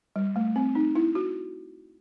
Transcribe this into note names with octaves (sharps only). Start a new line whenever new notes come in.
G3
A3
C4
D#4
E4
F#4